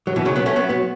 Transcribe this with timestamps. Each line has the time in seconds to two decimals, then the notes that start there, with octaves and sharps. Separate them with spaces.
0.07 F#3
0.16 B2 E3
0.25 C#3 F#3
0.36 F#3 B3
0.46 A3 C#4
0.56 F#3 B3
0.69 F#3 B3